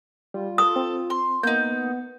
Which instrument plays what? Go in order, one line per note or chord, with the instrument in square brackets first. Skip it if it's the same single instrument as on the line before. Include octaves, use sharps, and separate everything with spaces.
[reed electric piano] G3 [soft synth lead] F4
[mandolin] A4 [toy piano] D#6
[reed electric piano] C4
[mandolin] C6
[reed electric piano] A#3 [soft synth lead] B3 [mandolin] D#4 G6